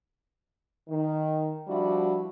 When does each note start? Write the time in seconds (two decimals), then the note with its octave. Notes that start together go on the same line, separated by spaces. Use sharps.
0.89 D#3
1.68 F3 G3 D4 E4 F#4